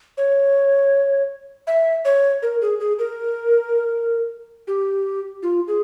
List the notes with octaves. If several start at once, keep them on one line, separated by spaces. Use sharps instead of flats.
C#5
E5
C#5
A#4
G#4
G#4
A#4
G4
F4
G#4